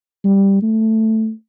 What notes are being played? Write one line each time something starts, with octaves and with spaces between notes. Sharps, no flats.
G3
A3